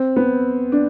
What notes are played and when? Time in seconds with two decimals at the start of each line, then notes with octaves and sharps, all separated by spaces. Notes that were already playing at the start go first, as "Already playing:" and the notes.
Already playing: C4
0.16 B3
0.72 D4